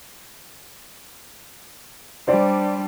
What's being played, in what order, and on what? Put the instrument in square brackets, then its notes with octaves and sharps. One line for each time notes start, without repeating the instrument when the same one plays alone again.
[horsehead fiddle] G3 D4 [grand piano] C5 D5